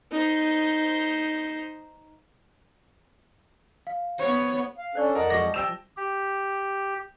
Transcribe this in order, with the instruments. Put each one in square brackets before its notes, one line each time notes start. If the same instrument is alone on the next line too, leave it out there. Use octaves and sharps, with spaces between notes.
[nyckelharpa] D#4 C5
[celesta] F5
[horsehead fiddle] B3 C#5 [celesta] C5
[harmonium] F5
[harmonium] C#4 D4 A4 [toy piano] C5 D5 C#6
[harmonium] F2 F#5 A5 [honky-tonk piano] A#4 [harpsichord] D#5
[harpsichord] G3 G#3 A#5 [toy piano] F4 C#6 D6 [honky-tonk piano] A#6
[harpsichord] F3 G3 [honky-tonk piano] G5 E6 E7 [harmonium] A5
[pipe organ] G4